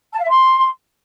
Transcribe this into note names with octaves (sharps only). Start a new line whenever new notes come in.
A5
F5
E5
C6